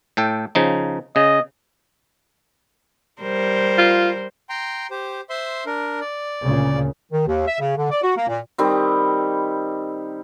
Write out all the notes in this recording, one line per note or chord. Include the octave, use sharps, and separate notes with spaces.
A2 A4 G5
C#3 F3 D#4
C#3 D#5
G3 A#4 C5
F4
G5 A#5 C6
G4 C5
C5 E5 C6
D4 A#4
D5
D2 A#2 C#3
D#3
D#2
E5
C#3
D3
D5
F#4
A#3
A#2
D#3 G3 C4